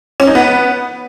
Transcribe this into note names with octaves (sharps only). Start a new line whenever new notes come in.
C#4
D#4
B3